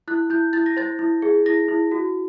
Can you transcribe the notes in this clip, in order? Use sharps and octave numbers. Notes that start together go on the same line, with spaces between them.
E4 F#6
E4 G6
E4 A6
A#6
C5 A6
E4
G#4
E4 A#6
E4
F#4